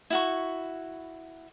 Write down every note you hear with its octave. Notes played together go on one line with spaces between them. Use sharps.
E4 F#4 C#6